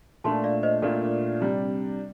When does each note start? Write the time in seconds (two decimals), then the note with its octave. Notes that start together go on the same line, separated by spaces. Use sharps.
0.24 A#2 A3 D4 F4 A5 C6
0.44 D5 F5
0.63 C5 D#5
0.82 A#2 A3 D4 F4 A#4 D5
1.41 C3 G3 D4